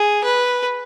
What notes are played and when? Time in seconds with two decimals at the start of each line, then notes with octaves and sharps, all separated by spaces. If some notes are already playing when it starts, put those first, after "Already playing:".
Already playing: G#4
0.24 B4